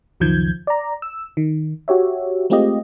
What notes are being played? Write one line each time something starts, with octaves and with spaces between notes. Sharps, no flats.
C#2 F#2 D#3 F3 G6 G#6
D5 A#5
E6
D#3
F#4 G4 C#5 E5
G#3 A3 C4 F4 G4 D#5